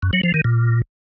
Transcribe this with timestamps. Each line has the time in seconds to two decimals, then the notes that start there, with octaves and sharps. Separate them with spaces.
0.03 F#2
0.13 F#3
0.23 F3
0.34 D#3
0.44 A#2